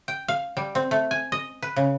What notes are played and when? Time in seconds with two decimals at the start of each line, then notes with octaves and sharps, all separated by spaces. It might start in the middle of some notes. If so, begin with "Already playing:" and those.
0.08 G5
0.28 F5
0.57 G3
0.75 C4
0.91 A3
1.11 G#5
1.32 D#5
1.62 B4
1.76 C#3